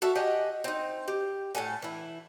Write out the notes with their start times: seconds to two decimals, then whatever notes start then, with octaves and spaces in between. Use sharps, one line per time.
0.02 F#4 A4 E5 F5
0.15 G4 D#5 F#5 G#5
0.64 C4 D#4
1.08 G4
1.55 A2 A4 F#5 G#5
1.82 E3 E4